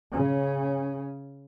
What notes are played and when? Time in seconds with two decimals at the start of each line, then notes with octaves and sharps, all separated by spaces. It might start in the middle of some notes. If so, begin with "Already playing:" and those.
0.12 C#3 C#4